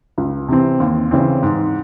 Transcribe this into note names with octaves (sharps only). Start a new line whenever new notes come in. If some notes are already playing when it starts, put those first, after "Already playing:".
C#2
C3 E3 C4
D#2
C#3 E3 C4
G#2